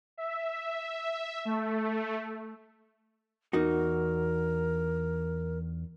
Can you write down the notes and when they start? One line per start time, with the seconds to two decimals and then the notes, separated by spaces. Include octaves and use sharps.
0.18 E5
1.45 A3
3.53 E2 D#4 F#4 A#4